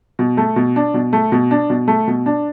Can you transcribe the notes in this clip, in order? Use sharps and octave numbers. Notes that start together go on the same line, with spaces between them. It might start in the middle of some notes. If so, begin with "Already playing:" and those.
B2
A3
B2
D4
B2
A3
B2
D4
B2
A3
B2
D4